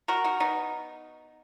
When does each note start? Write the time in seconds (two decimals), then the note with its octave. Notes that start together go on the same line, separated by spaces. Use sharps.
0.08 F#4 A#4
0.24 D#4 F#4
0.40 B3 D#4